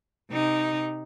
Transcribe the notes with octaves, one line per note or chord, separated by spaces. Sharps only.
C3 D#4